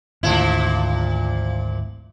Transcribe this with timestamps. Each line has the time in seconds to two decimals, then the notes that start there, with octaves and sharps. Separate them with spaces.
0.23 G#1 D2 A#2 F3 E4